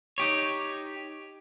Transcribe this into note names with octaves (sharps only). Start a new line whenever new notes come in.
D#4 G4 C#5